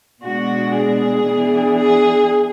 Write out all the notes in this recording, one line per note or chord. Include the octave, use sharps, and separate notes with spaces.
B2 G#3 B3 D4 F#4
G#4
E3 B3 D4
G#4